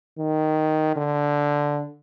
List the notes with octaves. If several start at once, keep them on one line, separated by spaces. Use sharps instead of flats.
D#3
D3